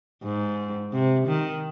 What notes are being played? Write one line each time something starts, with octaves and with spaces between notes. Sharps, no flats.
G#2
C3
D#3